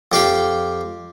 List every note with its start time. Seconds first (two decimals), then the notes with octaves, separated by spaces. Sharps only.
0.12 F2 G4 F5 G5